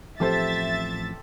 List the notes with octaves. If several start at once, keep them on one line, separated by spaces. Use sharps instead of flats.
A1 F3 C4 G4 A4 C5 E5 A6